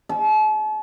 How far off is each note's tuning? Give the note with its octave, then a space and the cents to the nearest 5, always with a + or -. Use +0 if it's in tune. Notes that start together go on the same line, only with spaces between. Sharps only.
A5 -40